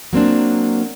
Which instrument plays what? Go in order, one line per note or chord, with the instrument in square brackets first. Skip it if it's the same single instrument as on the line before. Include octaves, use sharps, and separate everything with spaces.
[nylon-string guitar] F#3 A#3 C4 D4